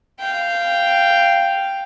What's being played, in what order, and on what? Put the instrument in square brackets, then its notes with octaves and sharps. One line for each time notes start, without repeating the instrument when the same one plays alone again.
[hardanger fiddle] F5 G5